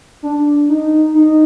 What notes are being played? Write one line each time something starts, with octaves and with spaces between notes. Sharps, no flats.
D4
D#4
D#4